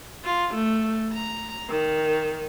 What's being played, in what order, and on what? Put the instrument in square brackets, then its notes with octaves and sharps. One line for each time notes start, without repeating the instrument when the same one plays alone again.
[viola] F4
A3
A#5
D#3